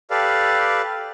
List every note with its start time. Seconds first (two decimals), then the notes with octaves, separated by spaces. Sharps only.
0.11 G4 A4 B4 D5 F5